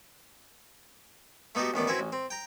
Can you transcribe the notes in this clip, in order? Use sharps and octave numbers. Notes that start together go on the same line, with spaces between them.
A3 B3 D#4 F#4 G4
A1 D#3 B3 D5
C4 C#4 E4 F#4 B4
A1
C4
G5 A#5